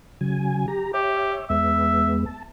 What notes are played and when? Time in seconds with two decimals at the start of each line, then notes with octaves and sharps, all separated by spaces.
0.21 C#3 F#3 G#5
0.68 G4 A#5
0.94 G4 C#5 E5
1.50 E2 G#3 B3 E5
2.26 A5